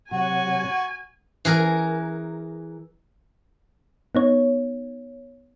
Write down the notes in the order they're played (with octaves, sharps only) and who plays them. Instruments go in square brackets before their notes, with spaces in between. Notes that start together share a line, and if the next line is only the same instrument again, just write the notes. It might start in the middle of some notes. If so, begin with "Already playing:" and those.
[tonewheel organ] C3 F#3 [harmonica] F#4 [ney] F#5 [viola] G#5
[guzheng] E3 G#4 A#4
[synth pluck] B3 D#4 C#5